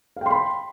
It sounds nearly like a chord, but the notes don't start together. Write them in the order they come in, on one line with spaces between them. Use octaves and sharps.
F5 G5 C6 B5